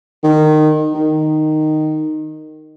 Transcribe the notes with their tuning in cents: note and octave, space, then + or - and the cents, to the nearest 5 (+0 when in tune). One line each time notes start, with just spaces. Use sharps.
D#3 -20
D#3 -10